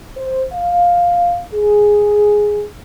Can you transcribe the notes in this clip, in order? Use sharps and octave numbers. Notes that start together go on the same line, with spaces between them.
C5
F5
G#4